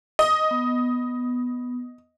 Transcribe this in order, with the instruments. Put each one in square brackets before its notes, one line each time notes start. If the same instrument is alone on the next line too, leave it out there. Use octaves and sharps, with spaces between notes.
[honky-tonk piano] D#5
[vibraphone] B3